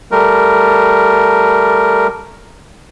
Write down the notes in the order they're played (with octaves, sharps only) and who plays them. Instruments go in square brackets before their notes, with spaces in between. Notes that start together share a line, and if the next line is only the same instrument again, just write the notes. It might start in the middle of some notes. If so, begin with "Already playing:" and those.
[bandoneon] G3 A3 A#4